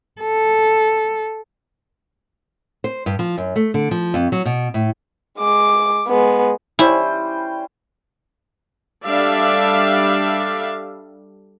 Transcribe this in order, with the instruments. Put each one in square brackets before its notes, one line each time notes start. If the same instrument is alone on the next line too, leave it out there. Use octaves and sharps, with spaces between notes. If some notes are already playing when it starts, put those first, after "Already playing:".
[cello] A4
[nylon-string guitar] C5
G2
F3
F#2
A3
D3
F3
F2
F#3
B2
A2
[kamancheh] G#3 D6
G#3 B3
[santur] G3 C#4 C5 [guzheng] E4
[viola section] G3 D4 A4 D5 E5 F5